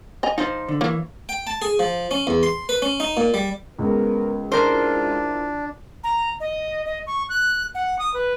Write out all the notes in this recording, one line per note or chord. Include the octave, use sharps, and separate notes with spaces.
D#5 G#5 A#5
F3 D#4 C5
D3
E3 A#3 C#5
G5
A5
G#4
F3
C#4
E2
C6
B4
C#4
D#4
A#2
G3
C#2 B3 A#4
D4 E4 F4 A#4 C5
A#5
D#5
D#5
C#6
F#6
F#5
D#6
B4